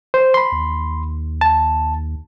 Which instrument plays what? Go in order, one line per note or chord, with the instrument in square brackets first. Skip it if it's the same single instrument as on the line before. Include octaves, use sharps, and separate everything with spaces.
[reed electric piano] C5
B5 C6
[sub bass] D#2
[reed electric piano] A5